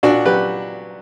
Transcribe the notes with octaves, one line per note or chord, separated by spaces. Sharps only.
A#2 D4 F#4
F#3 G4 B4